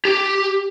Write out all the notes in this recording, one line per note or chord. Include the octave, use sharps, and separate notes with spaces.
G4